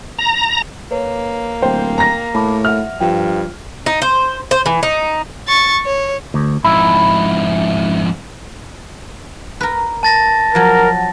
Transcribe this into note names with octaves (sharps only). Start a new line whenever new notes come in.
A#5
A#3 B4 C#5
D1 C5 G5
A#5 A#6
A2 A5 B5 D6
E5 F#5 F6
G2 F3 G5
D#4
C5
C5
E3
D#4
C#6 A6
C#5
D2
F2 G#2 E4
A#4 B4
A5 A6 A#6
F3 F#3 A#4